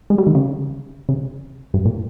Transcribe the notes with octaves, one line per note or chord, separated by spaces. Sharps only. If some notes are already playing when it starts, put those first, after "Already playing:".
G#3
G3
D#3
C#3
C#3
G2
A#2